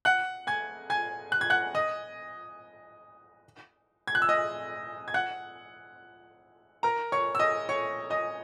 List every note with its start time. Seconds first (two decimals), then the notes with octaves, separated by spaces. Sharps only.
0.05 F#5 F#6
0.47 G#5 G#6
0.90 G#5 G#6
1.32 F#6
1.41 G#6
1.50 F#5 F#6
1.75 D#5 D#6
4.07 G#6
4.15 F#6
4.22 E6
4.29 D#5 D#6
5.08 G#6
5.14 F#5 F#6
6.83 A#4 A#5
7.12 C#5 C#6
7.35 E6
7.39 D#5 D#6
7.69 C#5 C#6
8.10 D#5 D#6